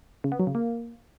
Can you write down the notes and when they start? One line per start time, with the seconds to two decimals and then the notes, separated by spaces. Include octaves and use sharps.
0.24 C#3
0.32 B3
0.39 F#3
0.47 C#3
0.55 A#3